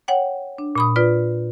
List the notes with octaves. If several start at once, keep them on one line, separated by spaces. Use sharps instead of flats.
C#5 F#5 G5
D4
A#2 B5 D#6
F4 B4 D5